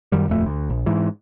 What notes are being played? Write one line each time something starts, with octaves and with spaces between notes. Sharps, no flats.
F#2 D#3 G3
D#1 F2 A3
D2
A#1
G#2 E3